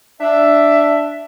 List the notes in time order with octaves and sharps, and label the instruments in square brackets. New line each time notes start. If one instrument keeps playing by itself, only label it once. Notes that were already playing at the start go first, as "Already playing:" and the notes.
[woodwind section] D4 E5